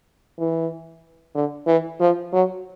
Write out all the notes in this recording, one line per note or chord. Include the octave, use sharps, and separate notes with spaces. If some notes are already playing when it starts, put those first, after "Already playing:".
E3
D3
E3
F3
F#3